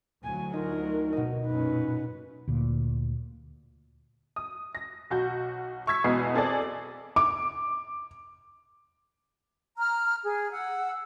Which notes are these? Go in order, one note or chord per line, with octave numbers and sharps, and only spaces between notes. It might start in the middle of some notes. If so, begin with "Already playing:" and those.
D2 F#3 G#5
D#4 F4 A#4
B2 D#4
F#2 A#2 C#4 B4
D2 A#2
D#6
A#6
B1 F#4 G6
C#6 E6 G#6 B6
B1 E2 G#3 B3 D#6 C7
C4 G#4 A4 D5
D6
A#5 F6
G#4
F#5 E6